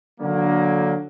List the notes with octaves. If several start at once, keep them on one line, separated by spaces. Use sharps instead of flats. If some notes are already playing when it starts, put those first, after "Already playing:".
D3 F#3 A#3